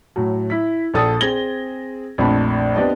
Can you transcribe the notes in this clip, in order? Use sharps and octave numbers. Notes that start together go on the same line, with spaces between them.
A2 F#3
E4 B6
A#1 A#2 A4 D#6 A6
C4 G#4 G#6 A#6 G7
A#1 F2 A3 D4 B5
B3 C4 D4 G4 D5 D#5